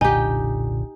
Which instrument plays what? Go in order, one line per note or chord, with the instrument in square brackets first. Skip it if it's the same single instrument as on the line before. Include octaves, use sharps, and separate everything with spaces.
[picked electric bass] F1 B1 D3 [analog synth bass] A#2 [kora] D#4 G4 [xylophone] G#5